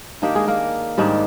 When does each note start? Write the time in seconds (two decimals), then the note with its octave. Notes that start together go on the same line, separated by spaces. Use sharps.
0.22 D#3 A#3 D4 G4
0.35 G#3 G#4
0.48 A#3 A#4
0.97 G#2 D#3 G3 D4